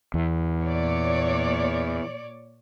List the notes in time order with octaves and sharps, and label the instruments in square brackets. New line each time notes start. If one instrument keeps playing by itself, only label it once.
[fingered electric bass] E2
[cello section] A#2 C#5 D5